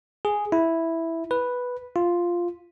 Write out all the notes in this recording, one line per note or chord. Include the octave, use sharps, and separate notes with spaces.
G#4
E4
B4
F4